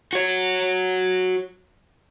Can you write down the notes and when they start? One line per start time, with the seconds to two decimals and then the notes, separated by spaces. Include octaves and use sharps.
0.13 F#4 C#5